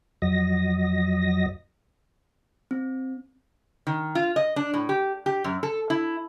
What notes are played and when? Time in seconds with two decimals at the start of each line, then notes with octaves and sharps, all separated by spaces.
0.22 F2 F#3 D#5 A#6
2.71 C4
3.87 D#3
4.15 F4
4.36 D#5
4.56 D4
4.74 A2
4.89 G4
5.26 G4
5.44 F#2
5.63 A4
5.90 E4